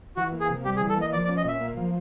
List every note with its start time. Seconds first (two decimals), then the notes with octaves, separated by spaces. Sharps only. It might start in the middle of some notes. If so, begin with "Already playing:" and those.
0.17 E3 F#4
0.32 A#3
0.40 G#4
0.49 C3
0.64 G3 G4
0.77 G#4
0.80 E3
0.89 A4
0.97 A#3 D#5
1.13 F3 D5
1.25 D5
1.29 C#4
1.37 D#5
1.45 A#2 E5
1.61 A#3
1.77 F3